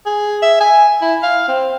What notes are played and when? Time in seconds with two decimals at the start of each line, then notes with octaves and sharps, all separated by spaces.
0.06 G#4
0.42 E5
0.60 G#5
1.02 E4
1.23 F5
1.48 C4